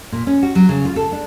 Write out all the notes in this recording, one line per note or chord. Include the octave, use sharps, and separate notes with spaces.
A#2
C#4
F#4
F#3
C#3
F4
A4
D4